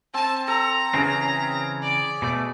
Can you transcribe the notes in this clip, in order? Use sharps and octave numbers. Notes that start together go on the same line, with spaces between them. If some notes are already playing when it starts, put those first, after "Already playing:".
C4 A5
A4 A#5
C#3 E3 C4 C#4 G#4
D5
B2 A3